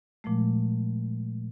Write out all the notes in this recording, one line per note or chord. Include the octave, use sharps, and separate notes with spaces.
A#2 F3 G#3 A3